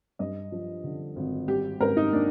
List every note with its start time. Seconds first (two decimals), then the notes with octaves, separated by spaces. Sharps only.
0.19 G2 D#5
0.52 F3
0.84 D3
1.16 G#1
1.48 G3 G4
1.80 G#2 A#4
1.97 D#4
2.12 A#3 D4